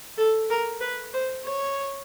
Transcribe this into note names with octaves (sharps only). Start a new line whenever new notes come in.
A4
A#4
B4
C5
C#5